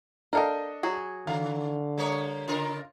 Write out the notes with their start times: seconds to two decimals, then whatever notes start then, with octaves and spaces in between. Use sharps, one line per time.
0.33 D4 A4 A#4 D#5 F5 G5
0.83 F#3 F#4 G#4
1.27 D3 D#3 F5
1.98 G3 A#3 C#5
2.48 C#3 F4 A#4